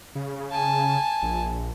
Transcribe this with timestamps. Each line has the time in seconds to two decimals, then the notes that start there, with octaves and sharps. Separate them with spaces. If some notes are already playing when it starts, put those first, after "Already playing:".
0.15 C#3
0.52 G#5 A5
1.22 A#1